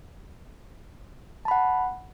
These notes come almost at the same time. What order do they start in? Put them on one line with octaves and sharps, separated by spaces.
A5 B5 F#5